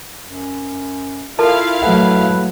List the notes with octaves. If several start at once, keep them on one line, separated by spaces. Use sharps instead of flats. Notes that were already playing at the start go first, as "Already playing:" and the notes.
F#2
E4 F4 A4 A#4 F5 A5
F#3 A3 B4 F#5